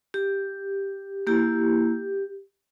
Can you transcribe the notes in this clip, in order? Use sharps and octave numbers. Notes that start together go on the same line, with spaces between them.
G4
A#3 E4 G4